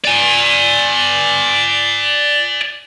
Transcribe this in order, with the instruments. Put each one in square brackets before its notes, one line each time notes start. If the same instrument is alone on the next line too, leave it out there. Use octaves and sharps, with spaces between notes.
[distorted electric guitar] D5 G#5